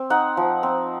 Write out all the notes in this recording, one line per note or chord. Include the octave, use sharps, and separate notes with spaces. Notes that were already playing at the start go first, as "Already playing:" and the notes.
Already playing: C4
D#4 F#5
F3
C4